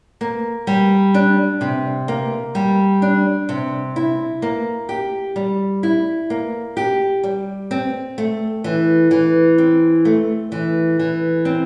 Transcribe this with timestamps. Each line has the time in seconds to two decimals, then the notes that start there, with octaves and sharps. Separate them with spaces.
0.21 A#3
0.67 G3
1.14 D4
1.61 C3
2.08 A#3
2.55 G3
3.02 D4
3.49 C3
3.96 E4
4.42 A#3
4.89 G4
5.36 G3
5.83 E4
6.30 A#3
6.77 G4
7.24 G3
7.71 C4
8.18 A3
8.64 E3
9.11 E3
9.58 C4
10.05 A3
10.52 E3
10.99 E3
11.45 C4